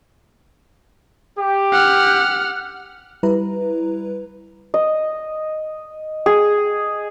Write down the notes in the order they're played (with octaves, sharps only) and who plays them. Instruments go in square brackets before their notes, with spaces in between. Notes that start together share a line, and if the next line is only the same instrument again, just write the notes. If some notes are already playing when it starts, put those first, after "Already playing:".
[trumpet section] G4
[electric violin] F#5 F6
[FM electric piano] G3 E4 B4 A#5
[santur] D#5
G#4